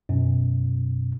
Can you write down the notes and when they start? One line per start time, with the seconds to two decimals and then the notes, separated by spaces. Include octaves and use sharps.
0.09 F#2 B2